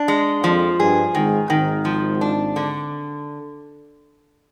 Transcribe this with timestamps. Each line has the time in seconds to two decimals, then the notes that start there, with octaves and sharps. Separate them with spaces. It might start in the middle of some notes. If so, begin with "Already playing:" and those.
Already playing: D4
0.08 G#3
0.44 F2 F3
0.80 G2 G#4
1.15 G#1 G#2 D#3
1.50 G#1 G#2 D#3
1.85 F3
2.21 D4
2.56 D3